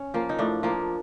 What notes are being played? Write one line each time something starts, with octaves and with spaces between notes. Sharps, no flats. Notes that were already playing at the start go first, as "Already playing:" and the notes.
Already playing: C#4
F3 A#3
D#4
A2 D4
F3 A#3